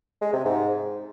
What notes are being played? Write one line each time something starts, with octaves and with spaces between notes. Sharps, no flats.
G#3
C3
G#2